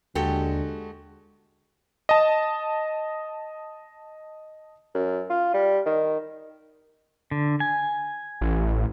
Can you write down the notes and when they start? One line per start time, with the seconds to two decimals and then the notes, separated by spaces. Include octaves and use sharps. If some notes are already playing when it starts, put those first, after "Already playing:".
0.15 D#2 D3 G#3 F#4 G4 A4
2.09 D#5 A5
4.94 F#2
5.30 F4
5.54 G3
5.86 D#3
7.31 D3
7.60 G#5
8.41 A1